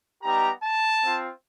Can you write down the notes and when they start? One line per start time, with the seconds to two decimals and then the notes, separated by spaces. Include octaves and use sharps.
0.22 G3 B3 D#4 G4 A#5
0.63 A5
1.03 C4 F4